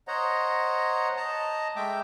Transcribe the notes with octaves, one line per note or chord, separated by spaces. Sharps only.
C5 C#5 D#5 F#5 A#5
D#5 A5 A#5
G#3 A3 E5 G5 D6